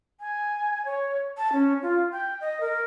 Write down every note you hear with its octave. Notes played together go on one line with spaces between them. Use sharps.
G#5
C#5
A5
C#4
F4
G5
D#5
A#4